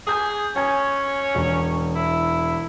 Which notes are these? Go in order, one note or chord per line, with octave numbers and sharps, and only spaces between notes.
G#4 G#5 G6
C#4 G#5 G#6
E1
E4